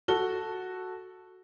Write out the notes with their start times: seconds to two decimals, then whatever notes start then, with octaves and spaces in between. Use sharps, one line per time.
0.08 F#4 A4 G7